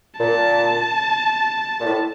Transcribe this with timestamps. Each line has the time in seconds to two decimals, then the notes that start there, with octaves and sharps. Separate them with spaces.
0.19 A#2 A5
1.80 A#2
1.85 A2